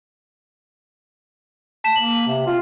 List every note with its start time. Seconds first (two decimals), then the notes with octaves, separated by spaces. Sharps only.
1.84 A5 B6 E7
1.96 A#3 F#7
2.27 C3
2.47 F4